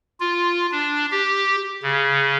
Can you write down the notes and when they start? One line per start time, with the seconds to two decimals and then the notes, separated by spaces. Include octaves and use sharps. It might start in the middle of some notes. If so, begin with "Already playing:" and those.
0.20 F4
0.72 D4
1.12 G4
1.83 C#3